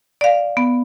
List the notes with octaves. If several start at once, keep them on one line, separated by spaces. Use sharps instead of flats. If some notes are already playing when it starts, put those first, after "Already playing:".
D5 F5
B3